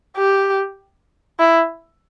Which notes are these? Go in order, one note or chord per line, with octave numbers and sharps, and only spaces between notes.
G4
E4